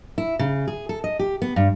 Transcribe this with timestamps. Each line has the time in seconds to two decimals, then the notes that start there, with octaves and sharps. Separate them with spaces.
0.18 E4
0.39 C#3
0.68 G#4
0.89 A4
1.04 D#5
1.19 G4
1.42 B3
1.56 G2